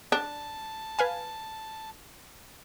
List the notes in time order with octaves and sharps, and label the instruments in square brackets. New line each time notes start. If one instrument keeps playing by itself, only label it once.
[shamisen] D4 [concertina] A5
[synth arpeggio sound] B4 F5 G#5